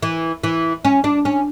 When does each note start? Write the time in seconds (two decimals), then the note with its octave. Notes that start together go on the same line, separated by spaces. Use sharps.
0.03 E3
0.43 E3
0.85 C#4
1.04 D4
1.25 C#4